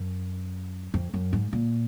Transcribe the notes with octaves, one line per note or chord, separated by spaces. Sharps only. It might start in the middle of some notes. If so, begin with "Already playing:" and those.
Already playing: F#2
F2
F#2
G#2
A#2